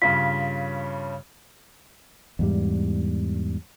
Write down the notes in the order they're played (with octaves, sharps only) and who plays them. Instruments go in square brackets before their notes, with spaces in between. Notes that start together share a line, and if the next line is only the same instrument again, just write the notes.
[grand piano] G2 C#3 F4 [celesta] B6
[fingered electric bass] E2 G#2 G3